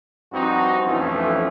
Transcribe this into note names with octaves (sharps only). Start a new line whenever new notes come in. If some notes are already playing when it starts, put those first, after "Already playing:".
G2 F3 C4 D#4 F#4
B1 F2 E3 F3 A3 C#4